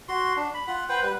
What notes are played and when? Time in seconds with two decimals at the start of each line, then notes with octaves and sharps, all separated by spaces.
0.09 F#4 C6
0.37 D4
0.54 B5
0.67 F4 F#5
0.89 B4 C5 F#5 G5
1.03 G3 B4